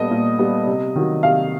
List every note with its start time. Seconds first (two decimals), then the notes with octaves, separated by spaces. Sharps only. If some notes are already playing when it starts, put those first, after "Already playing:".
Already playing: A#2 G3 B3 A4 D#5
0.11 A#2
0.39 G3 B3
0.67 C3
0.96 D#3 F#3
1.23 C3 F5